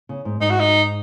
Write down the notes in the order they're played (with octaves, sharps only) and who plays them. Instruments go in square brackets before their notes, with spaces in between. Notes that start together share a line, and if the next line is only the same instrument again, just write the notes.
[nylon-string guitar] C#3
G#2
[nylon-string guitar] G#2 [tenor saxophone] D#4
[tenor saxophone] F#4
D#4